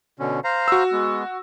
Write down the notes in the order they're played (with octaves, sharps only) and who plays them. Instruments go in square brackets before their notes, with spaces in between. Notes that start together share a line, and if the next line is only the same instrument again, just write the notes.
[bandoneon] B2 D3 C#4
C5 F5 A#5
[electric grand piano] F#4 E6
[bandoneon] G#3 B3